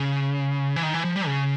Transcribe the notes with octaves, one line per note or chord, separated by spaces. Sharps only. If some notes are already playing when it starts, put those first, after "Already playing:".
Already playing: C#3
E3
D#3
E3
F3
G3
C#3